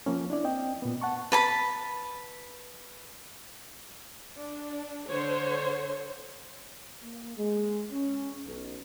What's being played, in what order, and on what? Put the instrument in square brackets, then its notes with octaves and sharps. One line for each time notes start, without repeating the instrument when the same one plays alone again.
[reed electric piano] F3 A#3 C#4
D4 E4 D5
C4 D#5 G5
A#2 B3
F#5 A5 C#6
[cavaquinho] B4 A5 B5
[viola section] D4
D3 C5 C#5
[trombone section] A#3
G#3
C#4
B1